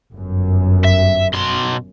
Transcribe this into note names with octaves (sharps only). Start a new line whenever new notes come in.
G1 F#2
E5
B2 C6